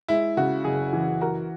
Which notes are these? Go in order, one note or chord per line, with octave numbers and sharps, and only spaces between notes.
G#3 E4
C#3 F#4
F#1 G#4
E3
F#4 A#4